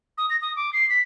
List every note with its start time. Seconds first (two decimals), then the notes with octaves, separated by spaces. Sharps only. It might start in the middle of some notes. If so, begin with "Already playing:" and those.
0.18 D#6
0.30 A#6
0.42 D#6
0.56 D6
0.73 C7
0.89 B6